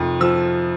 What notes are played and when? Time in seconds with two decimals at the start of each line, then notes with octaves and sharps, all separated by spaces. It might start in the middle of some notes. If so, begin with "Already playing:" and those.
Already playing: F2 C3 D#3
0.21 F3 E6